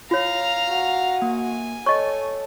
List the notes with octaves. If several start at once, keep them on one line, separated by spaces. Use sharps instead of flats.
F4 C#5 F5 A#5
F#4
A#3 G#5
A4 C#5 D#5 C#6